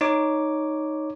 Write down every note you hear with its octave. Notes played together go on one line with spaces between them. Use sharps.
D#4 C#5 D6